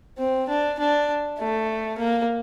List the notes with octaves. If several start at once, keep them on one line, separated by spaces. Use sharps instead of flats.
C4
D4
D4
A3
A#3